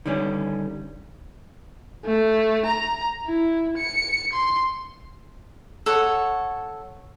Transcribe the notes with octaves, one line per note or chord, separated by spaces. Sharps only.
D3 D#3 G3 C#4
A3
A#5
E4
C#7
C6
A4 C#5 F#5